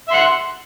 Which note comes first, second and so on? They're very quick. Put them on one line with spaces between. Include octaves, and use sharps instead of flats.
E5 C6 F#5